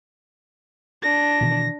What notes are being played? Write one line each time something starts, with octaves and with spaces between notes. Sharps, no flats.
D4 A#6
B2 D#3 E3